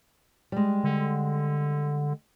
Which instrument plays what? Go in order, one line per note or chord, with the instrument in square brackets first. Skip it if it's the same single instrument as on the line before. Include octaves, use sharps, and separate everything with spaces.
[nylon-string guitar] G3 G#3
[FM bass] D3